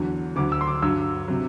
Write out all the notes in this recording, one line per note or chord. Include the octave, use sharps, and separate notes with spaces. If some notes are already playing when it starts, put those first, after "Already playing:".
Already playing: E2 D3 F#3
D2 D3 F#3 D6
E6
C6
D6
G2 D3 F#3 E6
C3 F#3